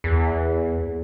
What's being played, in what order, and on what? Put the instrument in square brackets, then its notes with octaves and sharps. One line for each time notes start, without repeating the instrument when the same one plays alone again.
[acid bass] E2